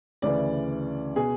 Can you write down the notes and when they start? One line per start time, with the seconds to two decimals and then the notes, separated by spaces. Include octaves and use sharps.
0.22 D2 C#3 E3 D5
1.16 B2 G#4